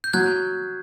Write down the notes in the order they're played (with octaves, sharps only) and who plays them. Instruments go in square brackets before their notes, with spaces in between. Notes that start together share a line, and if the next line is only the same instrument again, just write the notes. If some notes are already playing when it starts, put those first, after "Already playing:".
[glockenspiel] G6
[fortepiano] F#3 [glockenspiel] F#6 G#6